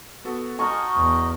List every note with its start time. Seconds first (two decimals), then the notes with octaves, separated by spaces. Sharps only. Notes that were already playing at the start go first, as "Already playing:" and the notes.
0.25 B3 F#4 A4
0.59 D#4 F#4 D#5 G#5 A5 C#6 F6
0.95 E2